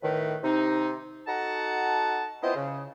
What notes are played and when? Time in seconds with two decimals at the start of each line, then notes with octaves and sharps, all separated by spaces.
0.03 A2 D#3 B4
0.43 C3 D#4
1.27 D#4 F#4 A4 F#5 A5 A#5
2.43 B3 C4 E4 F4 C5 D#5
2.56 C#3